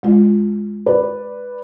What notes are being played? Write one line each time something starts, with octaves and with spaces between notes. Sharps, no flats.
D2 G#3 F4
B4 D5